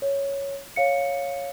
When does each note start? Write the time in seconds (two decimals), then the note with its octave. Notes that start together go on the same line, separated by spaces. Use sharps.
0.02 C#5
0.76 C#5 F5 C#7